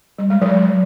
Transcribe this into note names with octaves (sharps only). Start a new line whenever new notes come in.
G3
G#3
F#3